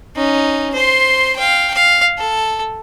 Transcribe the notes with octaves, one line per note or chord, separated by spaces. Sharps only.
C#4 D#4
C5 C6
F5 G5
F5
A4